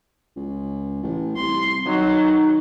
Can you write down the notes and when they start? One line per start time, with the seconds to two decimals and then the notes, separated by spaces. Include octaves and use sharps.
0.36 C#2
1.03 A1
1.36 C2 C6
1.86 D#3 F#3